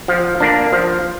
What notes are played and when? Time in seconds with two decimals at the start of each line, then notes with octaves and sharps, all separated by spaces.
0.08 F3
0.40 A#3 D4
0.73 F3